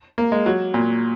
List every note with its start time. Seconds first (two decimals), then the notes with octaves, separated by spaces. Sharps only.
0.18 A#3
0.32 G#3
0.46 F#3
0.74 A#2